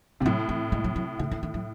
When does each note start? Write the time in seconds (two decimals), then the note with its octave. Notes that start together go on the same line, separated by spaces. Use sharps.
0.20 C3 E3
0.26 A2 F#3
0.49 E3
0.72 G#3
0.84 F#3
0.96 F#3
1.19 A2 C#3
1.32 D#3
1.43 D#3
1.54 F#3